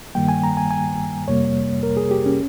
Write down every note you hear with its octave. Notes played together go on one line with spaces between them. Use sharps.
G2 D#3 G3 A#3 G5
G#5
A#5
G#5
G#5
F2 C3 G3 A#3 C#5
A#4
G#4
G4
C#4